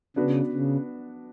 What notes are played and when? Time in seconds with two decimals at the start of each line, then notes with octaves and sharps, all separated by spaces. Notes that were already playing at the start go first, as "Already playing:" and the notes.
0.16 C#3 B3 D4 F#4 B4
0.52 C#3